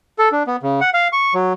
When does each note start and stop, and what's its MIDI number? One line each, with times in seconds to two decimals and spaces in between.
0.18 0.29 69
0.32 0.43 62
0.47 0.56 59
0.63 0.80 49
0.81 0.90 78
0.94 1.08 77
1.13 1.34 85
1.34 1.53 54